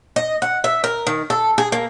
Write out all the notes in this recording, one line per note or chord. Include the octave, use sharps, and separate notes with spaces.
D#5
F#5
E5
A#4
D#3
A4
G#4
A#3